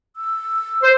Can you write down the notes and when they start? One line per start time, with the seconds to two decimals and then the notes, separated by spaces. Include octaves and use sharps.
0.16 E6
0.83 C5